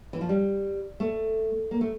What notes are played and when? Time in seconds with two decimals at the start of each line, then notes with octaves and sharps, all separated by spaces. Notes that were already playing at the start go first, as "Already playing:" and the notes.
0.13 E3
0.21 F3
0.29 G3
1.00 A3
1.71 A#3
1.81 A3